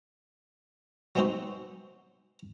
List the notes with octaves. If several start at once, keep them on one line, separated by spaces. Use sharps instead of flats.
F#3 G#3 B3 C4 D#4 F#4